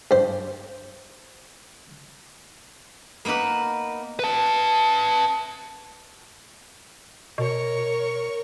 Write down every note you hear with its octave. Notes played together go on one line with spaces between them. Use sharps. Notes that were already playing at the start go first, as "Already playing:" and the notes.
G2 C5
A#3 B3 D#4 A#4 B4
B4 A5
B2 A#4 C#5 C#6